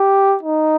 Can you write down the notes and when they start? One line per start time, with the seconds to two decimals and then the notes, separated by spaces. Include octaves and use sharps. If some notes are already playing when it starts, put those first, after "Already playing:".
Already playing: G4
0.43 D#4